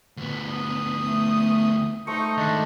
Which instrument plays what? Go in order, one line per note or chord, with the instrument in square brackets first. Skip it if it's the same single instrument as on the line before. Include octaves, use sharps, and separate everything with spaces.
[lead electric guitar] D2 B3
[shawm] D#6
[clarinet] A3
[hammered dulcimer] A3 C5 [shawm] D#4 [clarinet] C#6
[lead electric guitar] D#3 G#3 [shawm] D4 [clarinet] D#5